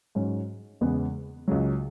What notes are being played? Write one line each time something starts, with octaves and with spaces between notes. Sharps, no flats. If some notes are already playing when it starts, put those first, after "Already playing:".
G#2 F#3 C#4
E2 C#3 G#3 B3
C#2 C#3 F#3